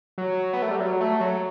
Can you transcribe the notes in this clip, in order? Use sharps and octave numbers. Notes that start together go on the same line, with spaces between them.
F#3
B3
A3
G3
F#3
A3
F#3